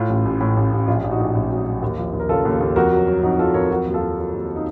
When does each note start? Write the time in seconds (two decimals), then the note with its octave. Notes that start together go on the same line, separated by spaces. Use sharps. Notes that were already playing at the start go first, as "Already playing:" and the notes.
Already playing: A2 F4
0.09 A1
0.25 A1
0.41 A2
0.57 A1
0.72 A1
0.88 A#1 F4
1.04 A#1
1.11 D#4 F#4
1.19 A#1
1.35 A#1
1.51 F#3
1.66 F#3
1.82 D#2
1.98 F3
2.13 D#2
2.20 A#4
2.29 C#3 F4 A4
2.45 D#2
2.60 D#2
2.76 F2 F#4 A#4
2.92 F#3
3.08 F#3
3.23 F2 D#4 F#4
3.39 F#3 F4 A4
3.54 F2 A#4 C#5
3.70 F#3 F#4 A#4
3.86 D#2 F#4
3.94 F4 A4
4.01 D#2
4.17 F#3
4.33 D#2
4.56 D#4